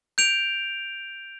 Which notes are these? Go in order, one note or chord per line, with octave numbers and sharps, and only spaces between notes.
G6 D7 F7